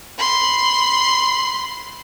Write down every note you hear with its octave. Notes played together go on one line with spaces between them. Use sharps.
B5 C6